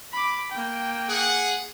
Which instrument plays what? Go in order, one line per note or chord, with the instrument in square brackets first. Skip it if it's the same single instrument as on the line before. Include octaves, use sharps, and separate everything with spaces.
[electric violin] B5 D6
A#3 G5
[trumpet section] G#4 F#5